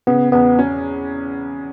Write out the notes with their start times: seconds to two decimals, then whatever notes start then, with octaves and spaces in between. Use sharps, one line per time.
0.07 C#3 B3
0.32 E2 B3
0.59 C#4